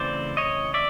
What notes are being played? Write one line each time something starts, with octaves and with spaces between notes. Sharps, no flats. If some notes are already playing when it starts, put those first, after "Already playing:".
Already playing: C#3 E3 A3 C4 C5 D5
C#5 D#5
D5 E5